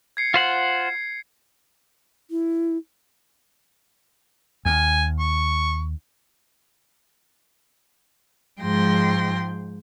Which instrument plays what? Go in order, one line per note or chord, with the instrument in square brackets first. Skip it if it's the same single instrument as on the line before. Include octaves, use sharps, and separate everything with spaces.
[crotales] G#6 C7 C#7
[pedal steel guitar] F4 C5 F#5
[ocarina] E4
[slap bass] D#2 [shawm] G#5
[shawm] C#6
[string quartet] G#2 F3 G#3 G5 C6 A#6